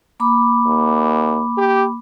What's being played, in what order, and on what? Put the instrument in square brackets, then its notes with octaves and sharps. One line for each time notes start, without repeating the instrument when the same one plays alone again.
[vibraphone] A#3 B5 D6
[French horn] D#2
G4